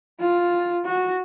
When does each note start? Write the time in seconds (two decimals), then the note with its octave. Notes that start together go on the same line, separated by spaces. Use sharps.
0.20 F4
0.85 F#4